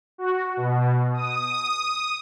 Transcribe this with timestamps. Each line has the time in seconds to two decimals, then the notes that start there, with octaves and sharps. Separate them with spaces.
0.18 F#4
0.57 B2
1.14 D#6